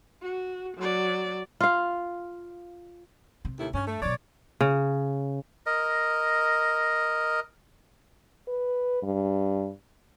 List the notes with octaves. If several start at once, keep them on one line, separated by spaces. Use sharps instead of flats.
F#4
F#3 D5
F4 F5
C3
D#2 A2 E4
G2 C#4
A3
B2 F#3 C#5 D5
C#3
A#4 D#5
B4
G2